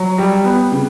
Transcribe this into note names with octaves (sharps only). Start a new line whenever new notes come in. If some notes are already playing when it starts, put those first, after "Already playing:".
Already playing: F#3
G3
B3
C#3